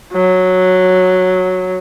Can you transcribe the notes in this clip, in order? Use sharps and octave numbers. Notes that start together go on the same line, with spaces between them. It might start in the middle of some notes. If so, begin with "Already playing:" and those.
F#3